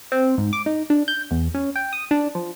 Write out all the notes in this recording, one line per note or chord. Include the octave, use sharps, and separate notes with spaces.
C4
G#2
D6
D#4
D4
G6
E2
C#4
G5
D#6
D4
F3